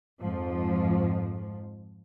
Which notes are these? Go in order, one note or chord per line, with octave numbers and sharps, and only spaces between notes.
F2 G#2 F3